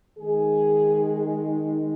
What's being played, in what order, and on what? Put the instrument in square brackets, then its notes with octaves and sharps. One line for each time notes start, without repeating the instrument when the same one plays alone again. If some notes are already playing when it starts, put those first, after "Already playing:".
[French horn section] D#3 G#3 D#4 G#4